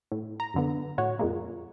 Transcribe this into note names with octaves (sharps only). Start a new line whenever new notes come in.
A2
A#5
F#2 D3 B3
A2 F#4 C#5
F2 A#2 G#3 A#3